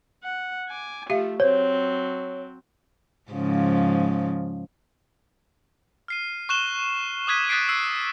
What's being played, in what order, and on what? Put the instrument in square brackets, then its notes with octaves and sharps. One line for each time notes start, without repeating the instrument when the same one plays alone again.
[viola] F#5
G#5 D6
[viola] F3 A3 [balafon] G4 E5 F5
[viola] F#3 C4 [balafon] C5 [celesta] C#5
[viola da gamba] G#2 C#3 F3
[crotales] F6 C7 D#7
C#6 F#6 E7 G7
D6 D#6 F#6 G#6 B6 D#7
D#6 F#6 A6 B6 C7 D7
E6 C7